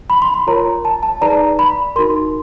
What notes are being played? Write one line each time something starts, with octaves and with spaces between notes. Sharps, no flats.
B5
C6
B5
F4 A#4 C#5 A#5
A5
A5
D#4 G#4 B4 D5 A#5
B5
D#4 F#4 A#4 C6